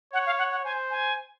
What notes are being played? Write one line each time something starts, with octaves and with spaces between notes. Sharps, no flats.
C#5 F#5
F5
F#5
F#5
C5 G#5
G#5